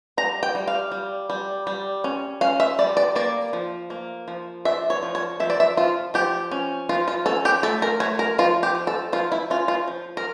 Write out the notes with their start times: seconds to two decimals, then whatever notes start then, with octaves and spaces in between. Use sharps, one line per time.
0.17 G3 A#5
0.43 G5
0.55 G3
0.68 F5
0.92 G3
1.30 G3
1.67 G3
2.04 C#4
2.41 C#4 F5
2.60 E5
2.79 G3 D5
2.97 D5
3.15 A#3 D5
3.53 F3
3.90 A#3
4.28 F3
4.65 D4 E5
4.90 C#5
5.03 F3
5.15 C#5
5.40 F3 E5
5.50 D5
5.60 E5
5.77 F3 F4
6.14 F3 G4
6.51 C#4
6.89 F3 F4
7.08 F4
7.26 C#4 A4
7.45 G4
7.63 A3 A4
7.82 A#4
8.00 A3 C#5
8.19 A#4
8.38 F3 F4
8.63 G4
8.75 F3
8.87 A4
9.12 F3 F4
9.32 E4
9.50 C#4 F4
9.68 F4
9.87 F3
10.17 A#4